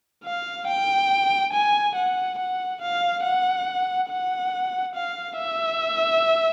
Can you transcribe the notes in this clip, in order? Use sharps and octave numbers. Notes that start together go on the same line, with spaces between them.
F5
G5
G#5
F#5
F#5
F5
F#5
F#5
F5
E5